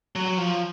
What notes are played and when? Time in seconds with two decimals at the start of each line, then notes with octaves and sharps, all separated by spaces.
0.16 F#3
0.38 F3